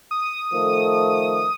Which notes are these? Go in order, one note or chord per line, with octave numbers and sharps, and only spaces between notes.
D#6
D#3 F3 A3